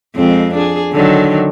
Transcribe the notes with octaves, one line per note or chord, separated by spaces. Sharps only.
F2 G#3 C4
D4 G#4
D3 D#3 F#3